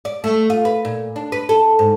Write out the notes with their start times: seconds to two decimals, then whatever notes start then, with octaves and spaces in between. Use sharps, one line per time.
0.05 D5
0.24 A3
0.50 F4
0.65 B4
0.85 A#2
1.16 D4
1.32 B4
1.49 A4
1.79 G#2